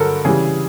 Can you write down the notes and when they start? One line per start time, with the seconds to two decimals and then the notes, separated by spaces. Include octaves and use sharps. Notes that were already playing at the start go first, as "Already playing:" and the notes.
Already playing: G2 D3 F#3 A4 A#4
0.25 C#3 E3 G3 G#4